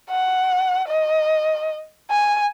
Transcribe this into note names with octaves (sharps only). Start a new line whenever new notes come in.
F#5
D#5
G#5